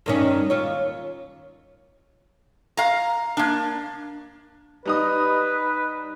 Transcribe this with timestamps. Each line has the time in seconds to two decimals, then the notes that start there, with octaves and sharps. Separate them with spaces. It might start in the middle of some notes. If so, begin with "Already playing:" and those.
0.06 G2 D#3 C#4
0.50 D#2 F4 C#5
2.77 F5 A#5
3.37 A#3 D4
4.85 G3 D#4 B4 D#6